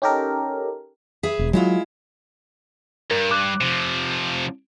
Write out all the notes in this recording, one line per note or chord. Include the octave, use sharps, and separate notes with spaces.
C#4 D#4 G4 A4 A#4
G#4 B4 E5
E1
F#3 G#3 E4 F4
G2 A#4
D6 F#6
C3 F3